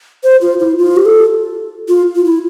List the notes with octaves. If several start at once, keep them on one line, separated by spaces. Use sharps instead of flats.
C5
F4
E4
F4
G4
A4
F4
F4
E4